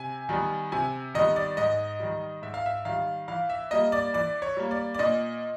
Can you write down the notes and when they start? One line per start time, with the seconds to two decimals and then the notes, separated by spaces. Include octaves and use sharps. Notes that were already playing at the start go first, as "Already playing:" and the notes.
Already playing: C3 G#5
0.29 D#3 G3 B3
0.72 C3 G#5
1.14 D#3 G3 B3 D#5
1.36 D5
1.57 G#2 D#5
2.00 D#3 G3
2.42 G#2 E5
2.54 F5
2.66 E5
2.85 D#3 G3 F5
3.28 E3 F5
3.50 E5
3.71 G3 A#3 D#5
3.92 D5
4.14 E3 D5
4.42 C#5
4.57 G3 A#3
4.71 D5
4.94 D5
4.99 A#2 D#5